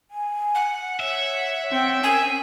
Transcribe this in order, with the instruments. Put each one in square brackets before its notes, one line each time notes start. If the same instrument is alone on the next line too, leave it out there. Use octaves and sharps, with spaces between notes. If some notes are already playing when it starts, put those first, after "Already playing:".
[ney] G#5
[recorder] F#5
[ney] C#5 [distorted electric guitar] E5
[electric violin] C4 G5 [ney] C#5
[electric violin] C#4 [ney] A#4 [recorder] G#5